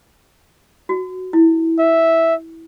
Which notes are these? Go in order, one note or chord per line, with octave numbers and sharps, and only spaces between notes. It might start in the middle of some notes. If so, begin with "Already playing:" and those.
F#4
E4
E5